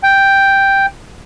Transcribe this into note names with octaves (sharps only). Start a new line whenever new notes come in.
G5